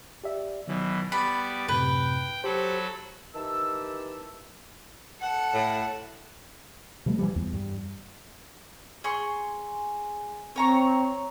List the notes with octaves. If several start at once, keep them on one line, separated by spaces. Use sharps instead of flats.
G4 D5 E5
B2 D#3 E3 F#3
G3 B3 D5 B5 F#6
F#2 A2 C3 B4 G5
F#3 G4 A4 C5 B5
D#3 E3 G4 A5 E6
A4 F#5
A2
B2 F3 G3 A3
E3 F3 G3
E2
G2
G#4 C6 C#6
C4 C#5 A#5 C#6